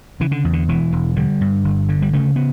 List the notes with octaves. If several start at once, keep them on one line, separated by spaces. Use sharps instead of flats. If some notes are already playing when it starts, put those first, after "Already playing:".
C#3 E3
D3
E2
D3
E1 E3
E1
D3 G3
G2
G1
D3
G3
C#3 A3
B3